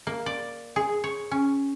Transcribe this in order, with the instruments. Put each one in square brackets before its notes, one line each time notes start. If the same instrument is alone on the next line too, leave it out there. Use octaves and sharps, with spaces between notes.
[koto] A#3
D5
G#4
C#5
C#4